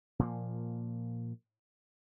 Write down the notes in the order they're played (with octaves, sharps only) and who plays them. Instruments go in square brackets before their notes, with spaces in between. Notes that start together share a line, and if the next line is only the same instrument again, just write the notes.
[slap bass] A#2 F3 A#3